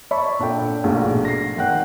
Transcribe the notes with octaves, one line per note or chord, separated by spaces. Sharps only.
C#5 D5 E5 A5 B5 C#6
A#2 D4 A4 G5
A#1 G#2 B2 A3 A#3
A#6 C7
G#1 F#5 G5 F#6